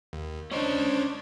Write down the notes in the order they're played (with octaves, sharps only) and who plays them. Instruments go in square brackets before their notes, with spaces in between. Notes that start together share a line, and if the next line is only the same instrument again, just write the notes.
[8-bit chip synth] D#2
[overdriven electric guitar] C#4 D#5 [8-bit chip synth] D4 C5 C#5